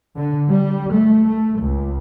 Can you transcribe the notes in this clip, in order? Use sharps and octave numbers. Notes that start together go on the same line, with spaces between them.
D3
G3
A3
A3
C#2